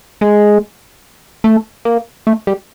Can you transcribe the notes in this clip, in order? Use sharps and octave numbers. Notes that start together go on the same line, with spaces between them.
G#3
A3
A#3
A3
G3